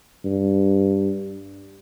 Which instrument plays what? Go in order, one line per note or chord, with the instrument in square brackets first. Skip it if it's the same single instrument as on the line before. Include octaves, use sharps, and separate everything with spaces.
[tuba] G2